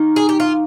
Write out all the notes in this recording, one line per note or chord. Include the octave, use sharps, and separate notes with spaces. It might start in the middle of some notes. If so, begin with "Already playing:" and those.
Already playing: D#3 A#3 D#4
G#4
G4
F4